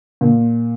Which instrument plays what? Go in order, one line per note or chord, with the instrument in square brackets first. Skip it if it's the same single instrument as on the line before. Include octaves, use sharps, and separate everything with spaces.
[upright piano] A#2